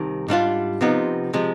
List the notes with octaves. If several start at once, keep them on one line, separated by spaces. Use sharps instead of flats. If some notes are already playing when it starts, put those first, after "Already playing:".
Already playing: C2 C3 D#3
G#2 G3 D4 F4
C3 F3 B3 D#4
C3 F3 G#3